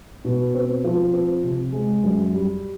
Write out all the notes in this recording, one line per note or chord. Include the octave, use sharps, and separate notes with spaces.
B2
C4
F3
C4
C3
G#3
F#2
G3